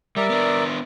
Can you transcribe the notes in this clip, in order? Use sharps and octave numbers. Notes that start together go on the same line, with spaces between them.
G3 A#4 D5 E5
B3 D4